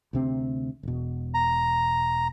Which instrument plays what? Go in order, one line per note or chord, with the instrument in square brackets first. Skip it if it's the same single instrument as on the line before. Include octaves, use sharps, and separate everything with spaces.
[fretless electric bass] D2 C3 C4
E1 B2
[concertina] A#5